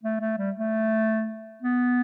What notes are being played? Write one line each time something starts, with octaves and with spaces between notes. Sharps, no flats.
A3
A3
G3
A3
B3